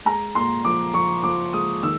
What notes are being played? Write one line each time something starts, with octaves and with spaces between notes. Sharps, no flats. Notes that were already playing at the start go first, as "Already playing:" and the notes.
G#3 A#5
A#2 C6
F3 D6
F3 C#6
F3 D6
G#3 D#6
D#3 E6